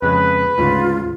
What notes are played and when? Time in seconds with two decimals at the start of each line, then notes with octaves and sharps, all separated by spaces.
0.02 F2 C#3 G#3 B4
0.58 D2 G#2 C#3 F4